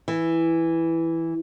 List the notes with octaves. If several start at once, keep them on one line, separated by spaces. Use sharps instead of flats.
E3